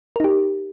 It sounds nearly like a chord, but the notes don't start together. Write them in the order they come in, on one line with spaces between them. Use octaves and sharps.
A#4 D#4 G4